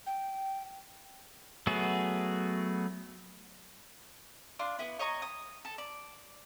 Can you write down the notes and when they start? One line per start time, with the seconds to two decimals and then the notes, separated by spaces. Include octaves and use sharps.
0.07 G5
1.67 F#3 A3 B3 F#4 G#4
4.59 D4 F4 C6
4.79 B3 E4
4.99 C#5 D#5 A#5 C#6
5.22 D#6
5.65 A4
5.78 D5